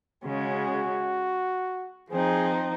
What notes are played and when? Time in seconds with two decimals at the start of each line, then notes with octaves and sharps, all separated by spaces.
0.24 C#3 G#3 C#4 F#4
2.10 F3 C4 D#4 G#4